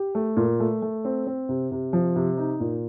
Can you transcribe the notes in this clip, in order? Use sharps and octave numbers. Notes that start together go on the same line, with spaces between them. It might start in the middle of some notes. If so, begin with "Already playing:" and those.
Already playing: G4
A3
A#2
A3
A3
C4
C4
C3
C3
F3
C3
D#4
A#2